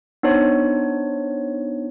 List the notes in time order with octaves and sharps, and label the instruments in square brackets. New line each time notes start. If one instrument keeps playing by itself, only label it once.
[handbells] B3 D4 D#4 C5 C#5